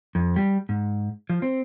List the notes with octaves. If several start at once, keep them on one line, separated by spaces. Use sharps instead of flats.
F2
G3
G#2
F3
C4